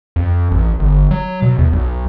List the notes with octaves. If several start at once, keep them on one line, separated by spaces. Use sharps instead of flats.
F2
A1
G1
F#3
B2
E2
B1